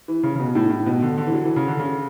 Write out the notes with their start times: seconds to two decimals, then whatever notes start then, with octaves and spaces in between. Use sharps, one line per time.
0.08 E3
0.23 C#3
0.35 C#3
0.39 B2
0.55 A2
0.70 A2
0.86 B2
1.02 D3
1.18 D3
1.27 E3
1.33 F#3
1.45 E3
1.56 C#3
1.68 D3
1.80 C#3